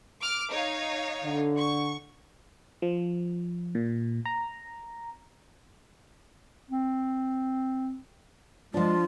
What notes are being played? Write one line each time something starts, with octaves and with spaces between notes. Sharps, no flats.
D6 F6
D#4 C#5 F5
D3
C#6
F3
A#2
A#5
C4
F3 G#3 D4 F4